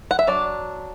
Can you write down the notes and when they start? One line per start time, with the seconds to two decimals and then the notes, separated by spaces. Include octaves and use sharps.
0.11 F#5
0.19 E5
0.27 F#3 D4 D5